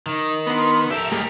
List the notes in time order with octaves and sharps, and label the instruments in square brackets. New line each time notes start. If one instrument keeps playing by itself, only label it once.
[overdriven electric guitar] D#3
[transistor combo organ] B3 [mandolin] D4 A#4 C6
[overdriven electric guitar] G4 A#4 [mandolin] A4 G5 [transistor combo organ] E5
[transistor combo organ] G3 G#3 A#3 [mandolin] F6